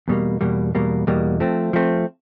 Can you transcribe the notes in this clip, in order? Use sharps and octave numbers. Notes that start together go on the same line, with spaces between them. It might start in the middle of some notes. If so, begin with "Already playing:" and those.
E2 B2 G3 A#3
E2 B2 G3 A#3
E2 B2 G3 A#3
E2 B2 G3 A#3
F3 A3 C4
F3 A3 C4